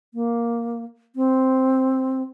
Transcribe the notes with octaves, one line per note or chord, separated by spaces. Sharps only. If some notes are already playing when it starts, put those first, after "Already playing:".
A#3
C4